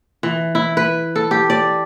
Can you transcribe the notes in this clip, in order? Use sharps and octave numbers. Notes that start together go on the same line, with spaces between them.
E3
E4
B4
A4
G4
D5